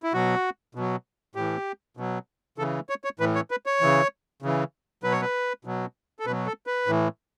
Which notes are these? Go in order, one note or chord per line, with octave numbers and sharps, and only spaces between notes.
E4
B2 F#3 F#4
B2 F#3
A2 E3 G4
B2 F#3
C#3 E3 A4
C#5
C#5
A2 E3 B4
C#5
B4
C#5
C#3 E3
C#3 E3
B2 F#3 B4
C#5
B4
B2 F#3
A4
B2 F#3 B4
A4
B4
A2 E3